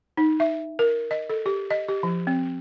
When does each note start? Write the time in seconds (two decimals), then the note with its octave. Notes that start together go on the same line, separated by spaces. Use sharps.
0.17 D#4
0.40 E5
0.79 A#4
1.11 D#5
1.30 A4
1.46 G4
1.70 D#5
1.88 G4
2.03 F3
2.27 C4